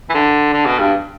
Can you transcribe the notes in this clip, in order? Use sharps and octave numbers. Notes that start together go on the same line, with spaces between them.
E3
D3
D3
B2
G2